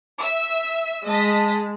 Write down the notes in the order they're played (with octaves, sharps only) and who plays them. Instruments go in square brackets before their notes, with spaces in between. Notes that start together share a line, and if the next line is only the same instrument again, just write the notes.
[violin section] E5 E6
[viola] G#3 [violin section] D#5 A5 B6